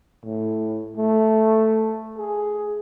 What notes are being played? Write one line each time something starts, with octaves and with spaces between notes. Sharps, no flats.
A2
A3
G#4